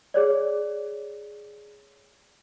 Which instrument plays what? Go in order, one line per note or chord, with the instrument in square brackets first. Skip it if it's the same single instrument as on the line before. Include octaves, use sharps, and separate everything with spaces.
[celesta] G#4 C#5 D5